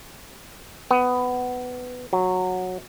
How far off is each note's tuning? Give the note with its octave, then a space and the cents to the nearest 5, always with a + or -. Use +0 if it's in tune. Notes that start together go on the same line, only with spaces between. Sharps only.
B3 +15
F#3 -10